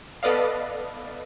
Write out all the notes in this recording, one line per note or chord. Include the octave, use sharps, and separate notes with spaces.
B3 A4 B4 D5 D#5 F5